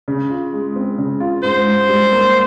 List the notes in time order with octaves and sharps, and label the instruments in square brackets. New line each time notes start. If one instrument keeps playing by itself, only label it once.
[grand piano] C#3
F4
G#3
C4
C#3
F4
[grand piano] G#2 [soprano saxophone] C5
[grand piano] G#2
G3
A#3